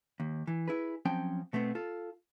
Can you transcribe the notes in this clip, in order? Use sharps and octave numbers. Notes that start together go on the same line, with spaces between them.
D#2
E3
E4 G#4 B4
F3 F#3 C4 C#4 G5 A5
B2 A3 B3 C4
F4 A4